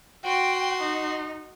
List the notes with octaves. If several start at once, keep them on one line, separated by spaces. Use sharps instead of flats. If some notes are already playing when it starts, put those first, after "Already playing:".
F#4 G5 C6
D#4